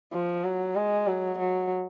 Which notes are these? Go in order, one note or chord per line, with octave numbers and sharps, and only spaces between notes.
F3
F#3
G#3
F#3
F#3